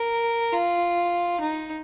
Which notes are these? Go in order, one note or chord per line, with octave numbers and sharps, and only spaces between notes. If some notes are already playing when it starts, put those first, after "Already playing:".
Already playing: A#4
F4
D#4